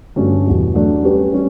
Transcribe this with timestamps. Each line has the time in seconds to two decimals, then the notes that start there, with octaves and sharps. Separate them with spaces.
0.16 G2 D3 A3 C#4 F#4
0.46 E2 B2 G3
0.74 F#3 A3 D4
1.04 G3 C#4 G4 B4
1.32 G3 C#4